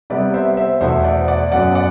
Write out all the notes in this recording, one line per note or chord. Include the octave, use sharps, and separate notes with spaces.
C3 G3 B3 B4 D5
C5 E5
C5 E5
E2 B2 A3 C5 E5
D5 F#5
D5 F#5
F#2 F#3 B3 D5 F#5
D5 F#5